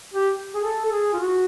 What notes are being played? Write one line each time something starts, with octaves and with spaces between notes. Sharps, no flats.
G4
G#4
A4
A4
G#4
F4
F#4